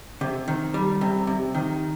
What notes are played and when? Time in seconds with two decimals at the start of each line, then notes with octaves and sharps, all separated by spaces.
0.21 C3
0.48 D#3
0.74 G3
1.01 C3
1.27 C3
1.54 D#3